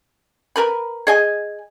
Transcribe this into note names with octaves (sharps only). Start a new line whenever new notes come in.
A#4 B4 B5
G#4 D#5 G#5